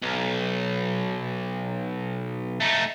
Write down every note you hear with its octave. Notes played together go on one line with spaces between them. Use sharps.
B1
A3 D#4